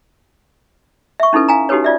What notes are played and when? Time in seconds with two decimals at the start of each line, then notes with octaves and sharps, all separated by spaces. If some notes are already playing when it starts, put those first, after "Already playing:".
1.20 E5 C#6
1.33 C#4 D#4 E4 A4 B4
1.48 F5 G#5 A#5
1.69 D#4 F#4 G4 A4 B4 C#5
1.84 F4 D5 E5